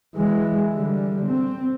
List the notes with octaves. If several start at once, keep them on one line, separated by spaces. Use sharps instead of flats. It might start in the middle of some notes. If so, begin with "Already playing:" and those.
E3 G#3
D3 G3
C4